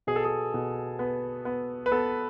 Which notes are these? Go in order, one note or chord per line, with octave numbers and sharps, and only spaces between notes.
B2 G#4
A4
G#4
B2
B3
B3
B4
B3 A4